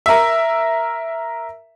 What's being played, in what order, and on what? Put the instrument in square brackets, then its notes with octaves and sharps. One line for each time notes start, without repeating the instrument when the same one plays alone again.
[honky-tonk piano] A#4 E5